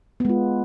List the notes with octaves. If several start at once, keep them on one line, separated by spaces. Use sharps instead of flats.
G#3 B3 F4